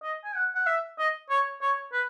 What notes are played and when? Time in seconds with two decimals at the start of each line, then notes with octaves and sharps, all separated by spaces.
0.03 D#5
0.24 G#5
0.35 F#5
0.55 F#5
0.67 E5
0.99 D#5
1.30 C#5
1.62 C#5
1.93 B4